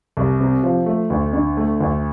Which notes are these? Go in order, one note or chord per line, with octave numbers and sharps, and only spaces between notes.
C2
C3
F3
A3
D2
D3
A3
D2